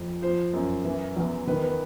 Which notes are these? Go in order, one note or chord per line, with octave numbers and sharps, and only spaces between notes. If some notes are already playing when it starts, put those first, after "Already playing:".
Already playing: F2
F3 C5
F#2
E3
E2
D#3 B4
B4